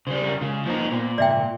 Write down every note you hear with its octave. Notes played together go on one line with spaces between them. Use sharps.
C#3 G3 C5
C#4 A#4
C#3 G#3 F4
E2 F3 A#3 D#4 B4
A#2 B3 C5
G#2 C#3 A#3 D5 E5 G5